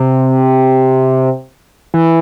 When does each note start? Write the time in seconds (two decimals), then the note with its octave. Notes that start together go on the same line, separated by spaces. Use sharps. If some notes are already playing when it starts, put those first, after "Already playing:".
Already playing: C3
1.94 E3